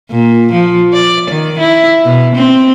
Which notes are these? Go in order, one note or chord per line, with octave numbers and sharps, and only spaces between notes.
A#2
F3
D5
D#3
E4
B2
C4